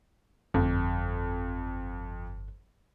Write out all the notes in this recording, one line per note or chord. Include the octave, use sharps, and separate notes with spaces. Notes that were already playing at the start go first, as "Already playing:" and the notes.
G1 F2